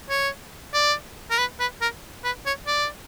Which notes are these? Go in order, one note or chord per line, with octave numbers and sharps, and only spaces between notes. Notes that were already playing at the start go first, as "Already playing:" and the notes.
C#5
D5
A#4
B4
B4
A#4
B4
C#5
D5